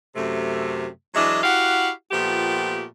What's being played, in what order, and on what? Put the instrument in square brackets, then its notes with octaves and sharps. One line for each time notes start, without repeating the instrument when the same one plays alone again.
[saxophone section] F#2 C3 A3
E3 F#3 G#3 D4 D#5 E5
E4 F#4 G4 F5 F#5
A#2 F3 A3 B3 G4